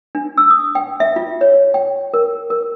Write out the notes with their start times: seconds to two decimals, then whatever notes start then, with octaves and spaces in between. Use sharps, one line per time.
0.15 D4
0.38 E6
0.50 D#6
0.75 G5
1.00 E5
1.16 F4
1.41 C#5
1.74 G5
2.14 A#4
2.50 A#4